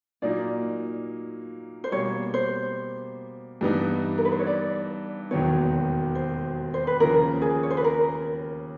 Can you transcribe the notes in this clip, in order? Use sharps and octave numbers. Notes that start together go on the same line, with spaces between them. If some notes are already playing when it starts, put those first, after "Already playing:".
A#2 F#3 A#3 D#4 D5
C5
B2 G3 A#3 C#5
C5
G2 E3 G3 B3 D#4
A#4
B4
C5
C#5
D5
E1 D#2 D#3 F#3 B3 C#5
C5
C5
B4
D#2 C#3 F3 A#4
G#4
C#5
C5
B4
A#4